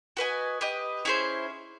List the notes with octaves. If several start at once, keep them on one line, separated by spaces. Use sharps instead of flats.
F#4 B4 D#5 G#5
G4 B4 D#5
C#4 E4 G#4 C5